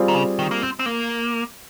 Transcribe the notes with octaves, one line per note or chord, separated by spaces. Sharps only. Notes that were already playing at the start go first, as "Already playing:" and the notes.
Already playing: G3 C4 F4 G#4
D#3
C#3
D#3
A#3
C4
C4
A#3